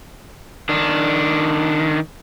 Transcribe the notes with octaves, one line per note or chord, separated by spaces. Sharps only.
D#3 D4